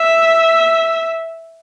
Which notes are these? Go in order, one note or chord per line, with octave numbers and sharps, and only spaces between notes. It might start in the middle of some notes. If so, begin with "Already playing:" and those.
Already playing: E5